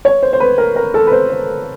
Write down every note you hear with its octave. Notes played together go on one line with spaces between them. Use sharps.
C#5
C5
C5
B4
A#4
A#4
A4
B4
C5
C5